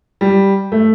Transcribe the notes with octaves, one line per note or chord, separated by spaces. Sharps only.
G3
A3